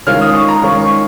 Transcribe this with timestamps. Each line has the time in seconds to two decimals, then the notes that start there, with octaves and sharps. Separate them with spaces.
0.07 D#3 G#3 C#4 F4 F6
0.21 D#6
0.35 C#6
0.49 A#5
0.62 D#3 G#3 C#4 F4 C#6
0.81 C#6